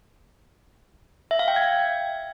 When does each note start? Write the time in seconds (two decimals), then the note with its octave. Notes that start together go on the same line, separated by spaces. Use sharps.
1.31 E5
1.39 F5
1.48 G5
1.56 G#6